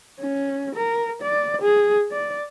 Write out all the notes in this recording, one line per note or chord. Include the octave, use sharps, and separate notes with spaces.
C#4
A#4
D5
G#4
D5